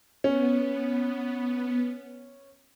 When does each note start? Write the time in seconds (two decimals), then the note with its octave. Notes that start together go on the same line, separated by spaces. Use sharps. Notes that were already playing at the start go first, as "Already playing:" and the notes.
0.24 B3 C#4